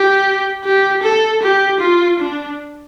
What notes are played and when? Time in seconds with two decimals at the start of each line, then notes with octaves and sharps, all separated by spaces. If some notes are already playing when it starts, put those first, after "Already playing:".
Already playing: G4
0.64 G4
1.03 A4
1.43 G4
1.81 F4
2.20 D4